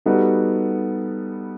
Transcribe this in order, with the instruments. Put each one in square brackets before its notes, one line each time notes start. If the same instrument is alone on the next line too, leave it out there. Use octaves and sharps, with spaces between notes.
[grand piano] G3 B3 D#4 F#4 A4